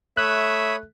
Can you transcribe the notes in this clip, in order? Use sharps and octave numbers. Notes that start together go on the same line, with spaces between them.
A3 C#5 E5 B5 D#6 F#6